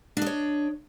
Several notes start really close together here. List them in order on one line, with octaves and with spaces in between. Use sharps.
D4 D#5 C#5